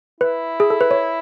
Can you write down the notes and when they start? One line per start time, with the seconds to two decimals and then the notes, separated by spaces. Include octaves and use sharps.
0.21 E4 B4
0.60 G#4
0.70 A4
0.81 B4
0.91 C#5